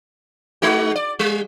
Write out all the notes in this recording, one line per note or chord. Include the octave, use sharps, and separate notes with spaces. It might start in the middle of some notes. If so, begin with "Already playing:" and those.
G#3 D#4 F#4
D5
G3